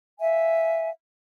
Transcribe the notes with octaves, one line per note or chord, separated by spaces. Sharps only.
E5 F5 G#5